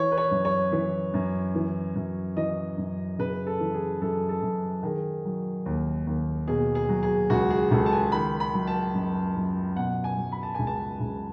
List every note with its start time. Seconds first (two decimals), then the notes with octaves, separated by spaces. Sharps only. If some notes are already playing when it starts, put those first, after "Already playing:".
Already playing: E3 C#5
0.12 B4
0.18 C#5
0.31 F#2
0.45 C#5
0.72 E3
1.14 F#2
1.55 E3
1.95 F#2
2.36 E3 D#5
2.78 F#2
3.19 C#3 B4
3.47 A4
3.60 E3
3.74 G#4
4.01 F#2 A4
4.29 A4
4.42 F#2
4.83 D#3 G#4
5.25 F#3
5.66 D#2
6.07 D#2
6.48 B2 G#4
6.75 G#4
6.89 F#3
7.03 G#4
7.30 C#2 F#4
7.50 G#4
7.71 C#2 A4
7.86 A5
7.92 G#5
8.12 D#3 B5
8.40 B5
8.54 F#3
8.67 A5
8.94 F#2
9.36 F#2
9.76 B2 F#5
10.04 G#5
10.17 F#3
10.32 B5
10.43 A5
10.55 C#2 G#5
10.67 A5
11.00 C#2